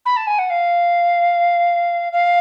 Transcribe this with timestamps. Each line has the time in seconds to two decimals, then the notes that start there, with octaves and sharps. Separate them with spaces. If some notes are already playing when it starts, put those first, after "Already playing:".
0.06 B5
0.17 A5
0.27 G#5
0.39 F#5
0.50 F5
2.13 F5